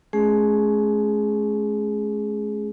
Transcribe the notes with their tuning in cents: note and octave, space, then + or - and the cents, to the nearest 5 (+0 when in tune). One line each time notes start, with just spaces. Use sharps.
G#3 +45 C#4 +0 G#4 +0